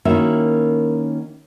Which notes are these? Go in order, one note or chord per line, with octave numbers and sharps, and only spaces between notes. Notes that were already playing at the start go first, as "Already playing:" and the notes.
D#3 A#3 C#4 E4 F#4 E5